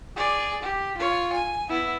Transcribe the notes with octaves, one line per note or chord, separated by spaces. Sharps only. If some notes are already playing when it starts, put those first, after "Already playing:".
G#4 D5
G4
F4 C#5
G#5
B3 E4